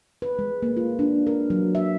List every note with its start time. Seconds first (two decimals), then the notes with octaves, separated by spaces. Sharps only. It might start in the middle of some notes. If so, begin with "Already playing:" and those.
0.22 B4
0.39 G#3
0.62 A#3
0.77 F4
0.99 D4
1.27 A#4
1.50 F#3
1.75 E5